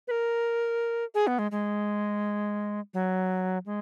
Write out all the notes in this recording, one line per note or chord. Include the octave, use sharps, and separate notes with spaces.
B4
A#4
G#4
B3
G#3
G#3
F#3
G#3